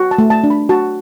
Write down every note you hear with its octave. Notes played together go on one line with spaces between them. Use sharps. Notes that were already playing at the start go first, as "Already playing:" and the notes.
Already playing: F#4
A5
A3
A5
D4
B5
F#4 A5